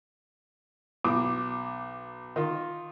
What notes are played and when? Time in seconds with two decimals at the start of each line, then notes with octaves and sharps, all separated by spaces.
1.04 B1 D6
2.36 D#3 F4